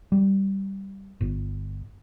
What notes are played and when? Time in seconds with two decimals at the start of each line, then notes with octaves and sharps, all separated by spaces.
0.12 G3
1.21 G1